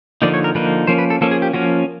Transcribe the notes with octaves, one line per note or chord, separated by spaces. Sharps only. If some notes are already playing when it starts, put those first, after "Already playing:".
D3 F3 A#3 D#4 D5
C#5
A#4
D3 F3 A#3 D#4 B4
F3 A#3 C#4 C5
B4
A4
F3 A#3 C#4 A4
G#4
G4
F3 A#3 C#4 F#4